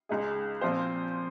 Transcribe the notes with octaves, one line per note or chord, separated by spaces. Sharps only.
C#2 C#3 G#3 D#4 G#4
A#2 F3 C4 F4 C5